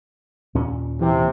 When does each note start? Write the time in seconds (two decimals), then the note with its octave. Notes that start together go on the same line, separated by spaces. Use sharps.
0.55 D#2 A#2 C#4
1.01 C3 E3